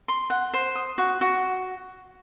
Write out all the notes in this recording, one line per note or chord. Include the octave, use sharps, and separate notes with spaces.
C6
F#5
C5
D#6
F#4
F#4